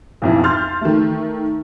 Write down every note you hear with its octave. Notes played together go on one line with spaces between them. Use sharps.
B1 F2 E4
C6 F6 G6 A6
D#3 A3